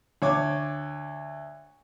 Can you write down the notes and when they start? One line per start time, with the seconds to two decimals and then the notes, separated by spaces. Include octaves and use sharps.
0.22 D2 C#5 D6